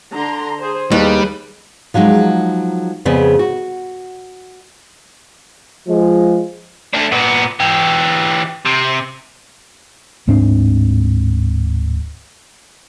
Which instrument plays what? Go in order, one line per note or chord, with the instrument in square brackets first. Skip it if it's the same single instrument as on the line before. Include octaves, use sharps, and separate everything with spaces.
[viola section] D3 A#5 C6
G#4 C5
[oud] D#2 [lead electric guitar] G3 [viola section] G#4 B4
[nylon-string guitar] F3 F#3 G#3 D#4 G4
F2 C#3 B3 G#4 D5
F#4
[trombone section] F3 G#3
[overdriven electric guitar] A3 D4
A#2 B3
E3 G4
C3
[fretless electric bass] D1 G#2 C4 D4